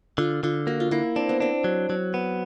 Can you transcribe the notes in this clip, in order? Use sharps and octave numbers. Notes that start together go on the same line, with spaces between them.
D3 F4
D3 F4
A#3 F#4
F4
A#3 E4
C4 D4
B3
C4 D4
F#3
F#3
B3